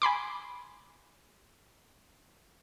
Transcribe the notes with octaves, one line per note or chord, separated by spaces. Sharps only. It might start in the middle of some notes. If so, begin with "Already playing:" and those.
G#5 B5 C6 D6